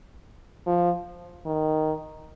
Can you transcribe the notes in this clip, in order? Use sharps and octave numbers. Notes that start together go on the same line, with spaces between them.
F3
D#3